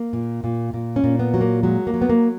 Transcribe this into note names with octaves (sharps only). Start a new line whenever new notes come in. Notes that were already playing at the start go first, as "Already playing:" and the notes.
Already playing: A#3
A#2
A#2
A#2
C#4
A#2
B3
F#3
A#3
F#3 G#3
A#3
F#3
B3
A#3